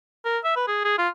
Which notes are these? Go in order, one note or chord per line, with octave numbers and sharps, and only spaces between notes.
A#4
E5
B4
G#4
G#4
F4